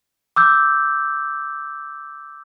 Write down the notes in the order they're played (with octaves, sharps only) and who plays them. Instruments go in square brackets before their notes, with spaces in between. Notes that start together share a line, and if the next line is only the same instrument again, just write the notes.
[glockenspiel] D6 E6 G6